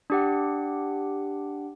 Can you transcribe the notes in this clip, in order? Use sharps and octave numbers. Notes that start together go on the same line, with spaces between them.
D4 G4 F#5